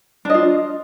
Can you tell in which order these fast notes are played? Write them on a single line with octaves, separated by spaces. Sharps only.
D4 D#5 F4